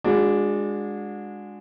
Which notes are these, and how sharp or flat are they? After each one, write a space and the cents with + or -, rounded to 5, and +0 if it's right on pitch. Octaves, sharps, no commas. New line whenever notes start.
G#3 -10 D4 +0 F#4 -35